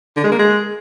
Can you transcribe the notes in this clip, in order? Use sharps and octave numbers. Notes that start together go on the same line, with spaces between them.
D3
G#3
A#3
G#3